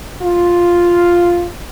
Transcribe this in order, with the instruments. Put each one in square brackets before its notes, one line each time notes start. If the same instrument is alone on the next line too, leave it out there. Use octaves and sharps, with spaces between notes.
[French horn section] F4